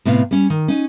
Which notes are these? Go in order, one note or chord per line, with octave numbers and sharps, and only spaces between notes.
A2 C3 B3 E5 F5
G3 C#4
D#3
C#4 D#4